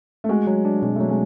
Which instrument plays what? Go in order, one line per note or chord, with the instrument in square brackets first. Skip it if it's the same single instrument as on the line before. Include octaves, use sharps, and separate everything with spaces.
[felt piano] A3
[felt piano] G#3 [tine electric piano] F#4
[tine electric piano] F#3
D4
[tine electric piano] B2 [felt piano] G#3
[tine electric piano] F#3 [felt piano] A3
[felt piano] G#3